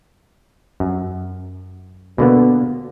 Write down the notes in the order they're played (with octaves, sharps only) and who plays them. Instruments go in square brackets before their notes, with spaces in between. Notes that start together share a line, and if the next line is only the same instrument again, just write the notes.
[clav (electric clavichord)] F#2
B2 D3 A#3 B3